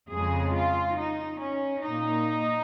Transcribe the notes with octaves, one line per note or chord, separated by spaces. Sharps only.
F2 C#3 G#3 G#4
F4
D#4
C#4
A#2 A#3 D#4